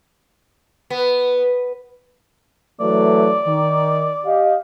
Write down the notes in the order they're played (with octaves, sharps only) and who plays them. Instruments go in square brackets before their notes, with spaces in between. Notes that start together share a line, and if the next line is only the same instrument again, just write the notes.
[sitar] B3
[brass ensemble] E3 F#3 A3 [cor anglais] D5
[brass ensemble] D#3
G4 D#5 F5